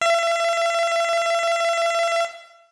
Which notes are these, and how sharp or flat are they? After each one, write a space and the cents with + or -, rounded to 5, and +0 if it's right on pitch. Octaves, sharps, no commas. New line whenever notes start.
E5 +40